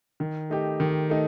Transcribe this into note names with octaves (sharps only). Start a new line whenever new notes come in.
D#3
A3 D#4 G4
D#3
A3 D#4